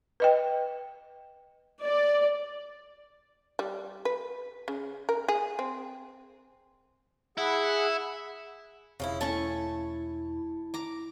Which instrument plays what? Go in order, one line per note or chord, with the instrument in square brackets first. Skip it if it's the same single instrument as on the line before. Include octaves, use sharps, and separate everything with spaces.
[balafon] B4 D#5 G5
[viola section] D5
[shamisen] G3
B4
C#3
A#4
G#4
C4
[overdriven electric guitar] E4 [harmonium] G#4 F#5
[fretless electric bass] E1 [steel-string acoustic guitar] C#3 F3 E4
[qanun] A3 C#4 C#6 [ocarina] E4 [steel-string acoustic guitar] A5
[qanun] A#5 D6